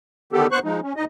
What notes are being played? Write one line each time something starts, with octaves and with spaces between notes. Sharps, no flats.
D3 D#3 B3 G4 A4
D2 B3 C5 C#6 F#6
F3 G#3 D#4
C#4
D2 D#4 D#5